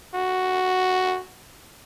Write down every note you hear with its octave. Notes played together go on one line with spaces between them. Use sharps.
F#4